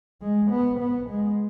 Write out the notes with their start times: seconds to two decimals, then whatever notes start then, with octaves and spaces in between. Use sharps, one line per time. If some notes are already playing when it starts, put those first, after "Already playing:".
0.22 G#3
0.51 B3
0.80 B3
1.10 G#3